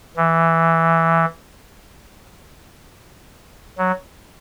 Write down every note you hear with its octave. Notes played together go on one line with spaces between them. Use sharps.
E3
F#3